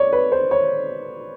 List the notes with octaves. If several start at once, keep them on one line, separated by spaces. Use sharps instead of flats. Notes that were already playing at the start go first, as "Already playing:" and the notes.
Already playing: C#5 D5
B4
C5
C#5